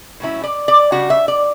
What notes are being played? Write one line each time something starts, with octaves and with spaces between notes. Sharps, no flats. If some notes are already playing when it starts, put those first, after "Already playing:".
A2 F#3 C#4 E4
D5
D5
C#3 G3 D4 F#4
E5
D5